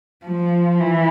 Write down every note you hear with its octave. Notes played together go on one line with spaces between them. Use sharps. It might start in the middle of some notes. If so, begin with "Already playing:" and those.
F3
E3